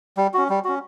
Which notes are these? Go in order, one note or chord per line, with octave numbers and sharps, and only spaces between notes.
G3
C#4 F#4
G3
C#4 F#4